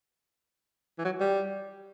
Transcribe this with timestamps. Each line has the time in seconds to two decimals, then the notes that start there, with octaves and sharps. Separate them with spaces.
0.98 E3
1.05 F#3
1.20 G3